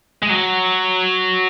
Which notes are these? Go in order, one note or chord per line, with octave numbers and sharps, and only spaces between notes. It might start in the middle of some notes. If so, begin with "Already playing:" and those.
G#3
F#3